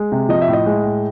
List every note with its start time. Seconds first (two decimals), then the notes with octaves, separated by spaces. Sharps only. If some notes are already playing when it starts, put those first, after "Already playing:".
Already playing: G#3
0.12 C3
0.29 F3 D#5
0.42 E5
0.48 A2
0.53 D#5
0.66 G#3
0.84 A2